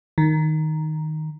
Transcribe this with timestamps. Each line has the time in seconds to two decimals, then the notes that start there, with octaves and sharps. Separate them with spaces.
0.18 D#3